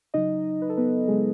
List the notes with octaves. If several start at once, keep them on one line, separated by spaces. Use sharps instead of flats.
C#3 F#3 D#4 D#5
B4
A4
B3 B4
C#3 F#3 G#3 G#4